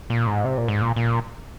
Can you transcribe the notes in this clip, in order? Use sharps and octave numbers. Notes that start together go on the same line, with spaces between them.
A#2
G#2
C3
A#2
G#2
A#2
A#2